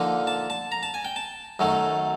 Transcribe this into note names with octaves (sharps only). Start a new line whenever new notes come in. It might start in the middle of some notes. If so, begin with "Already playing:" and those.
Already playing: D3 F3 A#3 D#4
A5
A5
A#5
A5
G#5
G5
A5
F#2 D#3 F#3 A3